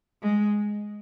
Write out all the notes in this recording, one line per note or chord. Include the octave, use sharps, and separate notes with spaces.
G#3